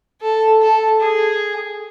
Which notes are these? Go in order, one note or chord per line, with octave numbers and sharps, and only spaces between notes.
A4
A4
G#4